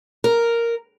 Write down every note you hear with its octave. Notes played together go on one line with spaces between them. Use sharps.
A#4